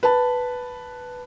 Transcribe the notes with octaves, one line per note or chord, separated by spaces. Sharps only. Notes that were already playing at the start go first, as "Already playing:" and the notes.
B4 A5